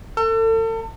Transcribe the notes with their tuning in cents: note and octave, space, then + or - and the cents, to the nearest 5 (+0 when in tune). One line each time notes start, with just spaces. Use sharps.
A4 +40